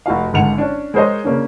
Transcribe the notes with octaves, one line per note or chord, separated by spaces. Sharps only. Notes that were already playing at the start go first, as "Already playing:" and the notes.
F1 F#4 F5
G#1 C#2 D3 F#5 C#7 F7
C#4 D4
G#3 G#4 A#4 C5 C#5 D#5
C#3 A#3 C#4 D4